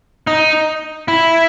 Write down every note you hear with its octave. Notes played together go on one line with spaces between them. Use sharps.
D#4
E4